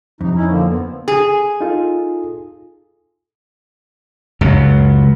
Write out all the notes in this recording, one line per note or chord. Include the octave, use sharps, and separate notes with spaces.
F2 C3 D#4
C#4 D#4 E4
D3 F3 A#3
B3 C4
G#4
D#4 F4 A4
C#2 F#2